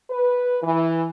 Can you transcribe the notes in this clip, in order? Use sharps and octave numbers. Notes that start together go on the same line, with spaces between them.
B4
E3